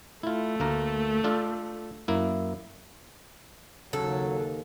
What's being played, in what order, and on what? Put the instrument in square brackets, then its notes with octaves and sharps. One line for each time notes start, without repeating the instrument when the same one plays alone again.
[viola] A3 [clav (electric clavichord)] E4 F4
[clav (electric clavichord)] D2 A#3 A#4
D4 F4 A4
F#2 A#3 E4
[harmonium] D#2 [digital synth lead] C#3 [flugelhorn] F#3 [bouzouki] A4